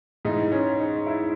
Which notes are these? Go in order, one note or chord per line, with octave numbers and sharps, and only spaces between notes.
G#2 E3 D#4
C#4
D#4
E4